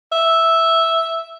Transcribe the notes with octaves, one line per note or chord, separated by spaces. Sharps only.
E5